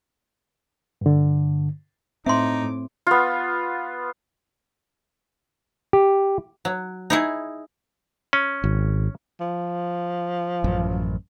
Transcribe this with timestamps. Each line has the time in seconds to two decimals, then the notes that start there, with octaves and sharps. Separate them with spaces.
1.01 G2 D3
2.26 A2 C4 D#4 E5 C6 D6
3.07 B3 F4
5.93 G4
6.65 F#3
7.10 D#4 E4 G#4
8.33 C#4
8.64 G#1
9.40 F3
10.64 A1 F#2